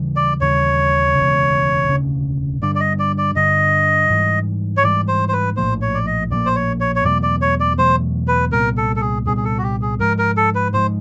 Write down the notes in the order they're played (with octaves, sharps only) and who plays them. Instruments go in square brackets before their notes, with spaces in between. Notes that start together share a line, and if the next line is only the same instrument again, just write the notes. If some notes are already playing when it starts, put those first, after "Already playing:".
Already playing: [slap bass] D#2 C#3 E3 G3
[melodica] D5
[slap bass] D#2 C#3 E3 G3 [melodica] C#5
[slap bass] E1 D2 C#3
E1 D2 C#3
[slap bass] G2 D3 G3 [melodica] D5
[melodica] D5
D#5
D5
D5
[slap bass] G2 D3 G3 [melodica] D#5
[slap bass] G#2 E3 G3
[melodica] C#5
[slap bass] G#2 E3 G3 [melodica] D5
[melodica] C5
C5
B4
[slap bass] A#1 A2 F3 A#3 [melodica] C5
[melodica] C#5
D5
D#5
[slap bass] A#1 A2 F3 A#3 [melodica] D5
[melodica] C5
C#5
C#5
C#5
[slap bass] E2 B2 F#3 A3 [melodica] D5
[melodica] D5
C#5
D5
[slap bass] E2 B2 F#3 A3 [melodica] C5
[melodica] B4
[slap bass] C2 A#2 G3 B3 [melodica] A#4
[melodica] A4
A4
G#4
[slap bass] C2 A#2 G3 B3 [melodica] G#4
[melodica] G#4
A4
F#4
G4
G#4
[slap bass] G#2 F3 G#3 [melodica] A#4
[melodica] A#4
A4
B4
[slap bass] G#2 F3 G#3 [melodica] C5